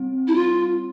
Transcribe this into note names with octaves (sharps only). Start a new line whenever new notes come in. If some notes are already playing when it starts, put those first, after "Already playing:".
Already playing: G3 C4
E4
F4